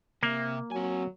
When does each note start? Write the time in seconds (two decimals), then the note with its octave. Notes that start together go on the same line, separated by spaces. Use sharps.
0.23 C3 A#3 E5
0.71 F#3 C4 G#5